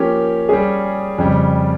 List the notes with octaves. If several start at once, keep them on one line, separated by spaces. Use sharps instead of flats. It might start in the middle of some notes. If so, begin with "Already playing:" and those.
Already playing: F3 A#3 C#4 G4
G3 C#4 G#4
F2 C#3 G3